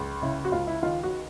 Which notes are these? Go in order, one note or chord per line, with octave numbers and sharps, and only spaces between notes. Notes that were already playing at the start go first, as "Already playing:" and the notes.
Already playing: C#2
C#3 E4
F#4
C#2 F4
E4
D#3 F4
F#4